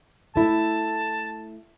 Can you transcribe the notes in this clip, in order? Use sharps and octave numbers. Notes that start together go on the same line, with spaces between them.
A3 E4 A5